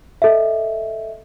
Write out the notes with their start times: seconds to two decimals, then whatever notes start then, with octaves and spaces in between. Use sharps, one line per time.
0.22 A4 D#5 E5